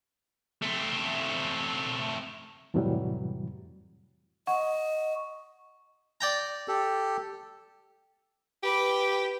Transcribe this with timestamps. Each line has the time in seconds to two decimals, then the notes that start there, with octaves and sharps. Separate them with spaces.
0.62 A3 C4
2.74 F2 A2 C3 E3 F#3 G3
4.47 D#5 F#5 C#6
6.21 D5 G5 A#5
6.68 G4 A4
8.63 G4 B4 D6